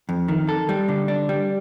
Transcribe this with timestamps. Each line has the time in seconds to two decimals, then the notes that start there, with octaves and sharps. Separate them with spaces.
0.09 F2
0.28 D#3
0.49 A4
0.69 G3
0.89 D3
1.08 D4
1.29 G3